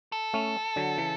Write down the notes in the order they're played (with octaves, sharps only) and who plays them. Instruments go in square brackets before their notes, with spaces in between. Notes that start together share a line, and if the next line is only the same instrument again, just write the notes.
[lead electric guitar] A4
[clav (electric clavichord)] A3 C#4
D3 F#3
C#3 E3